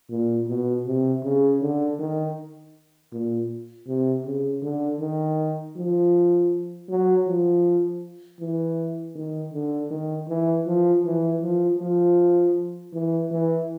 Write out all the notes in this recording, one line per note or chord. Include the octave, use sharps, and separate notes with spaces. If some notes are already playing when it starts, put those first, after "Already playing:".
A#2
B2
C3
C#3
D3
D#3
A#2
C3
C#3
D3
D#3
F3
F#3
F3
E3
D#3
D3
D#3
E3
F3
E3
F3
F3
E3
E3